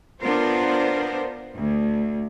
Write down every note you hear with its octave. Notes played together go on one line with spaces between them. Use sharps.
B3 D4 F4 A#4 C5
D2